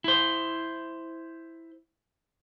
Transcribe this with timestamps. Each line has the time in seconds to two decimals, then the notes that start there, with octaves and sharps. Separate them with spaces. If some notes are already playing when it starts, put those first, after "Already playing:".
0.04 E4 C5